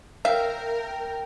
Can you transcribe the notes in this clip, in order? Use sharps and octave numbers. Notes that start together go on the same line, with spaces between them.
A#4 E5 F5 G5